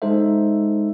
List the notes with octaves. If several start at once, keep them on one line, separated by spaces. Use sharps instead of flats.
G#3 D#4 A4 C5 E5